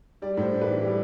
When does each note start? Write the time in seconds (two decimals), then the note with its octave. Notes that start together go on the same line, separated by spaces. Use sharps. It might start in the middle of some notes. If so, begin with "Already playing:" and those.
0.22 G3 D5
0.37 A2 C5
0.52 D4
0.62 B4
0.68 E3
0.82 G3